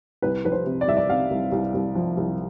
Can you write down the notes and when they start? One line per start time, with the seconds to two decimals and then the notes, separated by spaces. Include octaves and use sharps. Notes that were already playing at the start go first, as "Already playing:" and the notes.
0.22 C2 B4
0.44 F3 B4
0.52 C5
0.66 C3
0.81 D5
0.88 C2 E5
0.97 D5
1.09 C3 F5
1.30 C2
1.52 C2
1.74 C2
1.95 F3
2.17 C2